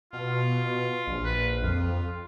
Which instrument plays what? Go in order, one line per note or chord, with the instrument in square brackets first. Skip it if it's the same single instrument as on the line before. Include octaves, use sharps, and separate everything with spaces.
[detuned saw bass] B2 [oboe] F4
[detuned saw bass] A#1
[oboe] B4
[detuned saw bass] F2 [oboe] F4